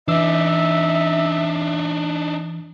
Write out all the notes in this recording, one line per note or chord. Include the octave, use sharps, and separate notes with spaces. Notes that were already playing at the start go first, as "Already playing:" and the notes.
E3 D4 D#4 E5 E6